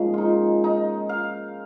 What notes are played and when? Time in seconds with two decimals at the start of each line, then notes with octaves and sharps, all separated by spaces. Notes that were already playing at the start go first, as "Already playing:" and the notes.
Already playing: G#2 F3 A#3 C#4 G#4
0.14 D#4 F4
0.64 D#4
1.09 F5